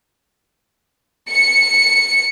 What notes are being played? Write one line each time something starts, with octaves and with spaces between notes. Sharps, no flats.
C#7